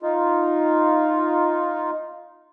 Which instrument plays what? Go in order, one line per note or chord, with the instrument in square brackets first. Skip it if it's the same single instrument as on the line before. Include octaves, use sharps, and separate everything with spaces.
[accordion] D#4 F4